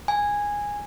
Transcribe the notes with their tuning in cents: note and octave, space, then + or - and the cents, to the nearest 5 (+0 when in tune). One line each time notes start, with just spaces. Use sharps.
G#5 -10